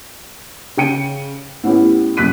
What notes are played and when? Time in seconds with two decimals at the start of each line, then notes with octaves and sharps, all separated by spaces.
0.77 C#3 G5 C#7 D#7
1.64 A2 B3 C#4 E4 G4
2.17 C2 F#2 F#6 B6 D#7